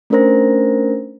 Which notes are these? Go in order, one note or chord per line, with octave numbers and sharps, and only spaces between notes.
A3 C#4 D4 A#4 C5 A#6